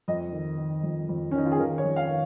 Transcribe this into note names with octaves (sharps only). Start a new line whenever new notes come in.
F2 D#5
D#3
D#3
F2
F2
C#4
D#3 D#4
F4
G#4
D#3 A#4
C#5
F2
F5
D#3